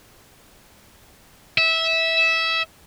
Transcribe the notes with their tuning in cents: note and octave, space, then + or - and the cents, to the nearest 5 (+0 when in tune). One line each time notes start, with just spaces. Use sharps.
E5 -15